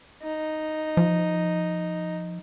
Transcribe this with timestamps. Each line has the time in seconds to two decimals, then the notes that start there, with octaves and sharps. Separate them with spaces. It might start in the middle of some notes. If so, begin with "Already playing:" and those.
0.23 D#4
0.97 F3